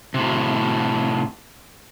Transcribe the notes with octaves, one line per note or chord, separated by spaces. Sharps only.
A2 C3